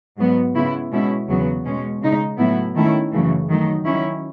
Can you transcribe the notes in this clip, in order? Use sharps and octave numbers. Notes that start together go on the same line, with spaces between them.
G#2 F#3 B3
C#3 G#3 B3 E4
B2 G#3 C#4 E4
E2 C#3 F#3 B3
B2 G#3 C#4
C#3 G#3 D#4
A2 F#3 B3 E4
D#3 A3 C#4 E4
F#2 C#3 E3 A3
D#3 F#3 A3 D#4
D#3 F#3 C#4 E4